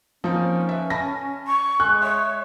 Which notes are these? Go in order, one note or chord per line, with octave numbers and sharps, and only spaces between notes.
F3 A#3 C4 C#4 D#4
B4 E5
G#5 A5 B5 A#6
C#6
G#3 G#5 F#6
C#5 E5